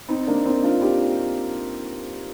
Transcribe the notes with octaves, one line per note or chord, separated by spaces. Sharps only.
C4 D#4
A#3 D4
C4 D#4
D4 F4
D#4 G4